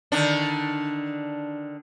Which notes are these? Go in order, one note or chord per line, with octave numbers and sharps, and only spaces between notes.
D3 D#3 D4